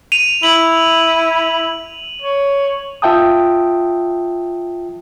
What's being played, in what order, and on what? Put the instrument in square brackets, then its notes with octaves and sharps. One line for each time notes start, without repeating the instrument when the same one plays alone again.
[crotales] D#7 F7
[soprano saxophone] E4 [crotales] F#7
[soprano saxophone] C#5
[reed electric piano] F4 E5 G5 A5 D#6